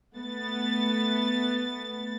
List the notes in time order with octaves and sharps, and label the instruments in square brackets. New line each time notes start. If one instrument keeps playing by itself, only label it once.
[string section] A3 B3 A6